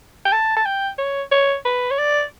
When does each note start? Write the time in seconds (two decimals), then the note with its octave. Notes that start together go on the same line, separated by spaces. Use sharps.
0.25 G5
0.32 A5
0.56 A5
0.66 G5
0.98 C#5
1.31 C#5
1.65 B4
1.91 C#5
1.98 D5